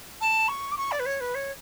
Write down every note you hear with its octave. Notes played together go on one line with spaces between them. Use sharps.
A5
C#6
D6
C#6
D5
B4
C#5
B4
C#5